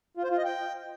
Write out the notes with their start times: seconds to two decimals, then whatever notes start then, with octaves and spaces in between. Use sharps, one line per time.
0.17 F4
0.24 C5
0.31 F4
0.38 D#5
0.44 G5